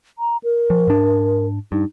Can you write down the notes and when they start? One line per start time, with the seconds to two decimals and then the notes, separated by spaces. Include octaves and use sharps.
0.19 A#5
0.43 A#4
0.70 F3
0.88 G#2 D4
1.72 G2 D#4